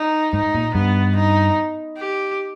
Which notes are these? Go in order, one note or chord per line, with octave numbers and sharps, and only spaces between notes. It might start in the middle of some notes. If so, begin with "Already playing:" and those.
Already playing: D#4
G#2 D#4
A#2
G2 B3
D#4
G4